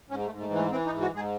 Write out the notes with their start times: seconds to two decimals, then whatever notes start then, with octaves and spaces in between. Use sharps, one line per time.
0.10 G#2 C#4
0.26 A3
0.31 G#2
0.41 A3
0.50 E3
0.55 A3
0.71 E3 C4
0.86 D#4
0.91 G#2
1.01 F#4
1.11 G#2 G#4